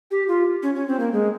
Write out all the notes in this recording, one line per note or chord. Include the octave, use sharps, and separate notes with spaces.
G4
F4
C#4
C#4
C4
A#3
G#3